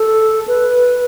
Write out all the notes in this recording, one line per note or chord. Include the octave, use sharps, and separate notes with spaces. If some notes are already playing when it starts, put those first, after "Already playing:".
Already playing: A4
B4